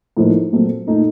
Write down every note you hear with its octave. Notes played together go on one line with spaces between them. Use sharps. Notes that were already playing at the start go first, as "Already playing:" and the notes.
A2 F3 A#3 D#4
A#2 F#3 A3 C4
A#2 A3 D#4